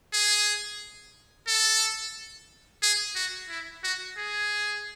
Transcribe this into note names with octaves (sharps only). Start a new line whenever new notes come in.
G#4
A4
G#4
F#4
E4
F#4
G#4